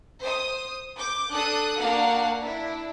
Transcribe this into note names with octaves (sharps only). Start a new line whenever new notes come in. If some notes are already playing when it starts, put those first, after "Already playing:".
C5 D#6
D6 G6
D4 A4 D#6 F#6
A#3 D4 F#4 F5 F#5
D4 E4